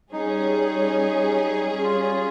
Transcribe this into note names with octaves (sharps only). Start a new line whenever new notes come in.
G3 C#4 D#4 G#4
F4